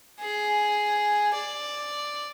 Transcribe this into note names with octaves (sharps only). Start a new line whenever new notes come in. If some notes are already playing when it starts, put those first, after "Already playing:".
G#4
D5